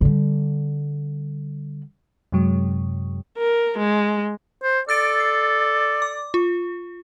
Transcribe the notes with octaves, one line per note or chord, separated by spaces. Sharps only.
D3 G3
F#2 C3 F#3 G#3
A#4
G#3
C5
A4 D5 E6 A6 D7
C7
D6
F4